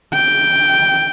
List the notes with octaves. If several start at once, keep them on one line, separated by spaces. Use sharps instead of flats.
G5